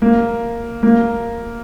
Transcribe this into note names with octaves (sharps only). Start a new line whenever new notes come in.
A#3
A#3